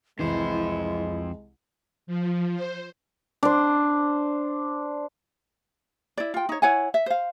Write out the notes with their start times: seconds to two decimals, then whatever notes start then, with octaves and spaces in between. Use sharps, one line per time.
0.19 C2 F2 E3 G#3 E4 C5
2.07 F3
2.55 C5
3.43 D4 C5
6.18 E4 D5
6.34 F4 G5
6.49 D#4 C#5
6.62 E4 C#5 F#5 G#5
6.94 E5
7.06 C5 F5